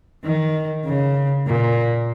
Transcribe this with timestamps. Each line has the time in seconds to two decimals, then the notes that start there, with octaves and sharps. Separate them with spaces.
0.24 D#3
0.85 C#3
1.46 A#2